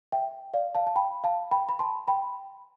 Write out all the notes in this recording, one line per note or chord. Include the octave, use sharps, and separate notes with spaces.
E5 G5
D5 F5
F5 A5
A5
G5 B5
F5 A5
G5 B5
B5
A5 C6
G5 B5